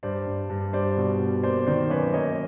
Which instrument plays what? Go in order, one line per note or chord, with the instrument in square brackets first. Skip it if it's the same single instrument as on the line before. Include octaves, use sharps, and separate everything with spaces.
[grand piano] G2 C5 D5
G2
G2
G3 C5 D5
B2
B2
A#3 C5 D5
D#3 C5 D5
F#2 B4 C#5
A#3 C#5 D#5